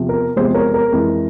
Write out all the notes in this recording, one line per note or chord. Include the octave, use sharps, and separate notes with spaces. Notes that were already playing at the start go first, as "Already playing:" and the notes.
Already playing: E2 C3 F3
A#4
E2 C3 F3 G#3 G#4 C5
A#4 C#5
A#4
F2 E3 G#3